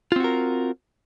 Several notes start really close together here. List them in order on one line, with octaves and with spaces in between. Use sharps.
F4 C4 F#4 A#4